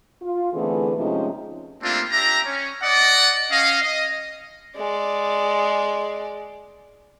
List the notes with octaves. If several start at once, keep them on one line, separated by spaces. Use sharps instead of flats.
F4
D3 E3 A3 B3 C4 G#4
C3 F3 G#3 A3 C#4 D#4
G3 A3 A#3 C4 D4 F4
D4 G4 E5 A#5
C#4
D5 D#5 F#5
C#4 D#5 F5
D#5
G#3 D5